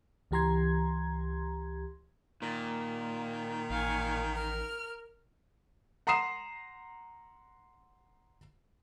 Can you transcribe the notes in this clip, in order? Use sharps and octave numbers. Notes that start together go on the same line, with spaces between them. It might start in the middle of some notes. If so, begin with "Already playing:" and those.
C#2 E3 G4 A#5 C6 G#6
A#2 D#3
A1 F5 G#5 C#6
A#4 F6
F#5 A#5 C6 D#6 C7 E7